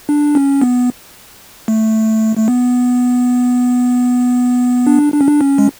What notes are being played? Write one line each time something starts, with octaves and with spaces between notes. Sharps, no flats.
D4
C#4
B3
A3
A3
B3
D4
D4
C#4
D4
C#4
G#3